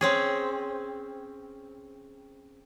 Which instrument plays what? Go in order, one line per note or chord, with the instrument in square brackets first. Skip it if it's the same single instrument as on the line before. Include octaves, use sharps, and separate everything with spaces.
[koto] C4 C#4 G#4